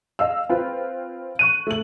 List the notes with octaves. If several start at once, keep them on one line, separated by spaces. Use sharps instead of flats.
D#5 F5 E6
C4 F4 B4
C#6 F#6 D#7
A3 F#7